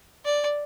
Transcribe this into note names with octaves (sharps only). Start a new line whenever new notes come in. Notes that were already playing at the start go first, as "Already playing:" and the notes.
D5